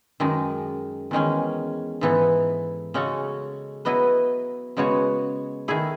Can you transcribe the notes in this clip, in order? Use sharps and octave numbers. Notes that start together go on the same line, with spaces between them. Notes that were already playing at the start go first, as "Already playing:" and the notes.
F#2 D#3 G#3
E2 D#3 G#3 C#4
G#2 E3 B3 D#4 A4
C#3 G#3 C#4 F#4 A4
F#3 B3 E4 B4 D#5
C#3 G#3 B3 F#4 C#5
D#3 A3 E4 G#4